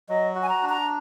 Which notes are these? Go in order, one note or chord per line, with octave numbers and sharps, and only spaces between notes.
F#3 D#5
F#4
G#5
A#5
D4
A#5